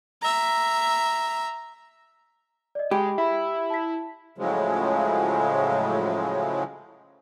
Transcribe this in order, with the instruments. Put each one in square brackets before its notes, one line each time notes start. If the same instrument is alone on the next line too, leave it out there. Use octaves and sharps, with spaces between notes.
[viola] E5 A#5
[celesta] D5 D#5
[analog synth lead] G#3 [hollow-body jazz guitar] G4 [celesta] G5 B5
[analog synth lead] E4 [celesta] E5 B5
[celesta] A5 B6
[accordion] A2 C#3 F3 F#3 G#3